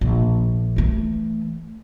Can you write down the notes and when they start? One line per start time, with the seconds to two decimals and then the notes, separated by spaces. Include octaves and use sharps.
0.01 A#1
0.76 E3 A3